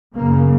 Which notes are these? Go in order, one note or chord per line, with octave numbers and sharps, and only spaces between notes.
F#2 C#3 A#3